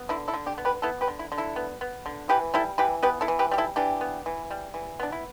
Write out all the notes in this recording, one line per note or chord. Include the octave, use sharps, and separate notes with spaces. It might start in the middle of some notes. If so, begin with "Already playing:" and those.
Already playing: B3
D3 E4
E4 A4
D3
D4 G4
B3
G4 B4
B3 E4 A4
G4 B4
D3
E4
D3
E4 A4
B3
B3
D3
E3 G4 B4
G3 E4 A4
E3 G4 B4
B3 G4 B4
E4 A4
E3
G4 B4
G3 G4
E4 A4
E3 D4 G4
B3
E3
G3
E3
B3 D4
E4